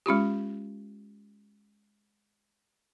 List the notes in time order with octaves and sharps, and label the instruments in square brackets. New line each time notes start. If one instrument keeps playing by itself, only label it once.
[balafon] G#3 C#4 F4 G4